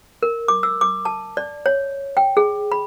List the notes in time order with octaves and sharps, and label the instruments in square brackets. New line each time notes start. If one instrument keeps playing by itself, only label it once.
[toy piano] A#4
D6
E6
D6
A5
D5
C#5
G5
G#4
B5